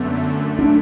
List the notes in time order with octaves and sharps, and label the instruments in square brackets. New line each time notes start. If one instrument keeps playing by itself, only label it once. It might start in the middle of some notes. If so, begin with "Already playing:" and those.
Already playing: [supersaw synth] F#2 D3 A3 [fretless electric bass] B3
[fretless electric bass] D4